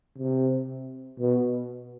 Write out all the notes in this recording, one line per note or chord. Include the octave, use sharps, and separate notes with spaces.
C3
B2